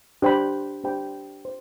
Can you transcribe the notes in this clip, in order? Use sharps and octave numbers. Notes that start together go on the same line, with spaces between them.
D4 G4 C5 G5 B5
D4 G4 C5 G5 B5
C5